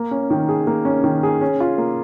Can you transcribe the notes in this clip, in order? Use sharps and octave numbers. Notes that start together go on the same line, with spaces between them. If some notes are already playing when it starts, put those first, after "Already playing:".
Already playing: A#3
C#4
D#3
G#4
A#3
C#4
D#3
G#4
C#4
F4
A#3